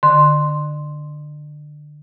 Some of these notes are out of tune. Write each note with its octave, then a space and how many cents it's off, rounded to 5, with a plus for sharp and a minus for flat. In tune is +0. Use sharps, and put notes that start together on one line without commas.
D3 +20 C6 +0